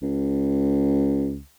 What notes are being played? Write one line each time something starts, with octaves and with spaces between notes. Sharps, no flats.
C#2